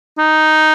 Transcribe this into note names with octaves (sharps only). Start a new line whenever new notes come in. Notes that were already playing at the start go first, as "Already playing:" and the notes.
D#4